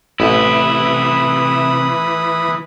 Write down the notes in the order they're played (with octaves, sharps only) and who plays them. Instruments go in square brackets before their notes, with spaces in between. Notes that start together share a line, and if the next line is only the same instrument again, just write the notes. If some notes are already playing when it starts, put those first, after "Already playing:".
[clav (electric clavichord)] A1 [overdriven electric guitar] C3 E4 [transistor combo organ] E3 [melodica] B5 D#6